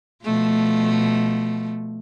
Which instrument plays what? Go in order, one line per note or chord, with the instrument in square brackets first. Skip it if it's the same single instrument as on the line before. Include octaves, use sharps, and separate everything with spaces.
[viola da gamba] B2 F3 A3